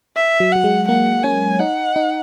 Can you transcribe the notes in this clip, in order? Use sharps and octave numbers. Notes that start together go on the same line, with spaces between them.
E5
F#3
F#3 F#5
G#3
A#3 F#5
C#4 G#5
D#4 F#5
D#4